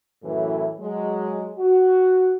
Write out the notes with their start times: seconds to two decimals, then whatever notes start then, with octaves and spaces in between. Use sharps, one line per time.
0.24 F#2 A2 E3
0.80 F#3 G#3
1.58 F#4